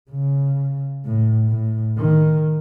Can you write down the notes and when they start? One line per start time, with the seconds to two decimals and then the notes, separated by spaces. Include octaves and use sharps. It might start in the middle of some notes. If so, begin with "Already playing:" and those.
0.11 C#3
1.06 A2
1.49 A2
1.98 D#3